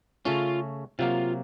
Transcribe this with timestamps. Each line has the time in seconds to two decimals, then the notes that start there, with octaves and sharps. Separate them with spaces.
0.25 C#3 A3 C#4 F4
0.99 C3 F#3 A#3 F4